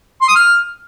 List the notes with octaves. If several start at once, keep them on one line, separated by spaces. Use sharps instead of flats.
C6
D#6
F6